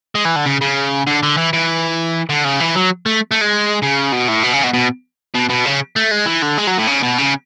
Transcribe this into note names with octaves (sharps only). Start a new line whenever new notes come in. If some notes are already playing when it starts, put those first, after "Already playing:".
G#3
E3
D3
C#3
C#3
D3
D3
E3
E3
D3
C#3
E3
F#3
A3
A3
G#3
C#3
B2
A2
B2
C#3
B2
B2
B2
B2
C#3
A3
G#3
E3
D3
G#3
F#3
A2
C#3
B2
C#3